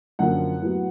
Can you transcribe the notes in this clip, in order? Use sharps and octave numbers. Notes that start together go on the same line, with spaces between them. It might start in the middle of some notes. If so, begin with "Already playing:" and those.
F#2 D3 F3 A#3 F#5
A2 F#3 B3